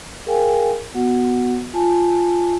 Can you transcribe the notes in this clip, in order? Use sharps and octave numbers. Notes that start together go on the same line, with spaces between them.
G#4 A#4 F5 G5 G#5
B3 F#4 F#5
F4 G#5 A5